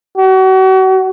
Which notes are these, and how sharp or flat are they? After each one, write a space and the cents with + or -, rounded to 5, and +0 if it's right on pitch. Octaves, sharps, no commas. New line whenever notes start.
F#4 +35